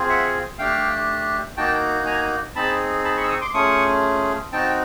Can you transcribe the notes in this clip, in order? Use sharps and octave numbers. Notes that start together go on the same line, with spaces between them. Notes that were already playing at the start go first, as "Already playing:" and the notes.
Already playing: C4 F4 G#4
E5 F#5
A3 D4 G4 F5 G5
A#3 D#4 F#4 G5 A5
G#5 A#5
C4 D#4 G#4 A5 B5
A5 B5
B5 C#6
E6
C#6 D#6
C6 D6
A3 C#4 F4 G#4 C#6 D#6
C4 D#4 F#4 G5 A5